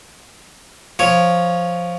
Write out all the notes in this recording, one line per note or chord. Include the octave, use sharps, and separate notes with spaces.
F3 C#5